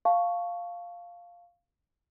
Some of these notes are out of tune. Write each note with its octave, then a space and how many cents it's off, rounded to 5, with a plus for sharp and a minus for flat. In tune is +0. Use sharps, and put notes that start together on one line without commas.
F5 +0 A5 +0 C#6 +0